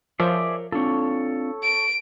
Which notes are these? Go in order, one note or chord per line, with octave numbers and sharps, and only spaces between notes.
F3 G#4 A#4 C#5 D5 E5
C4 D4 F4 A4 C#5
D7